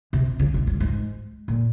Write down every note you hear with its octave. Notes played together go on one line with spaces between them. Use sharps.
C3
C#3
C3
G2
G#2
A#2